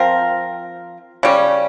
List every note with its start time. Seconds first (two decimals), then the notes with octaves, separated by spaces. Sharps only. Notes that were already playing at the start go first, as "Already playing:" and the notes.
Already playing: F3 C4 F4 A#4
1.23 C#3 G3 C#4